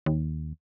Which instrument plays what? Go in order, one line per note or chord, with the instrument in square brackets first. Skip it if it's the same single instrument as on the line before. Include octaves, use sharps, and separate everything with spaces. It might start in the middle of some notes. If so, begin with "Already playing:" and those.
[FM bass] D#2